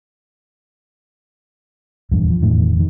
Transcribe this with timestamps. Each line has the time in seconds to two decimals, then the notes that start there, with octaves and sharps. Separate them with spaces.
2.12 D#1 E2 G2
2.30 F3
2.42 E1 E2 A2 D#3
2.76 F2 D#3